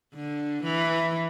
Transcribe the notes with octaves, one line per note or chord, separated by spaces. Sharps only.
D3
E3